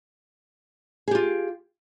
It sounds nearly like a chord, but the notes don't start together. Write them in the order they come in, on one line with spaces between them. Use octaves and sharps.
G#4 G4 F4